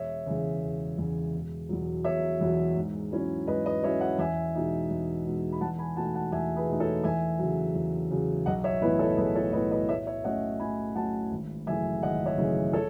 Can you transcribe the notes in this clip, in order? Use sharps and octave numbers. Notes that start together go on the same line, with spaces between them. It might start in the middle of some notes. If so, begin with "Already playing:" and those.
Already playing: E1 C#5 E5
E2 C#3
E1
E2 C#3
E1
E2 B2 F#3
E1 C#5 E5
E2 B2 F#3
G#2
F#3 C#4 E4
G#2 B4 D#5
B4 D#5
F#3 C#4 E4 C#5 E5
D#5 F#5
E2 E5 G#5
B2 G#3 D#4
E2
B2 G#3 D#4
B5
E2 F#5 A5
G#5 B5
B2 A3 D#4 F#5 A5
F#5 A5
E2 E5 G#5
G#4 B4
B2 A3 D#4
A4 C#5
E2 E5 G#5
C#3 F#3
E2
C#3 F#3
B1 D#5 F#5
C#5 E5
A2 E3 B3 E4 B4 D#5
A4 C#5
B1 G#4 B4
A4 C#5
A2 E3 B3 E4 B4 D#5
B4 D#5
A2 C#5 E5
C#5 E5
F#3 A3 C#4 D#5 F#5
A2 G#5 B5
F#3 A3 C#4 F#5 A5
G#1
F#2 C#3 E3 A3 E5 G#5
G#1 D#5 F#5
C#5 E5
F#2 C#3 E3 A3
A4 C#5